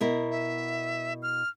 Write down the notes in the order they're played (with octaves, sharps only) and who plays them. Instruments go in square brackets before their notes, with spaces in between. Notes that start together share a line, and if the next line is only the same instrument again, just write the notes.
[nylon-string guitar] B2 E4 A#4
[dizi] E5
F6